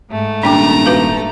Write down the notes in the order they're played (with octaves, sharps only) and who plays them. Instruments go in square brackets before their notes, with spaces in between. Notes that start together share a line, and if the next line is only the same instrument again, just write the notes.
[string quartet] G#2 A3
[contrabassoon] D#1 [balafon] D4 G5 D6 [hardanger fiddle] A#5
[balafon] F#4 B4 F5